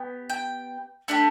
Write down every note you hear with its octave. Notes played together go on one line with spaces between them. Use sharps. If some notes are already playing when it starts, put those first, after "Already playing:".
Already playing: B3 G4
G5
A3 D4 G4